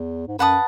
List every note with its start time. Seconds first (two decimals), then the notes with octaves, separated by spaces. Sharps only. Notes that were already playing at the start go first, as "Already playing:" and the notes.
Already playing: E2
0.27 G#2
0.38 F#2 B4 F#5 A5 D#6